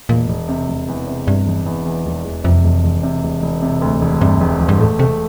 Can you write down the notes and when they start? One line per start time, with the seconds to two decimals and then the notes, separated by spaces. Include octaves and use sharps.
0.09 E1 A#2
0.28 E1
0.49 C3
0.68 E1
0.88 E2
1.08 C3
1.27 G2 C3
1.46 E1
1.66 E2
1.85 E2
2.06 E1
2.25 E1
2.44 F2 C3
2.64 E1
2.84 E1
3.03 C3
3.23 E1
3.42 E1
3.62 C3
3.82 D2
4.01 E1
4.21 G2 C3
4.41 E1
4.60 E1
4.69 G2
4.80 A2 A3
4.99 C3 A3